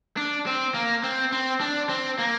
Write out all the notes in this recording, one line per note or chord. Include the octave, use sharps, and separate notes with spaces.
D4
C4
A#3
C4
C4
D4
C4
A#3